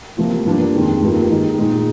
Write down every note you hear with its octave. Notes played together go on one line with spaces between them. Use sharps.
C3 F3 A#3 F4
G2 F3 A#3 D4
F2 D#3 G#3
G2 D#3 G3 A#3 F4
D#3 G#3 D#4
A#2 G#3 D#4